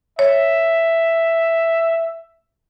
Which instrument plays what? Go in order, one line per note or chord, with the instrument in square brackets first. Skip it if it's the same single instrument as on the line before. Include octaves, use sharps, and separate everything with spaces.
[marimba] C#5 [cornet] E5